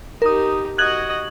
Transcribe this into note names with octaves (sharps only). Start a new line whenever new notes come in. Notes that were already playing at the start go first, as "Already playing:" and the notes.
D#4 G4 A#4 D#6
F#4 D#5 F#6 G#6 F#7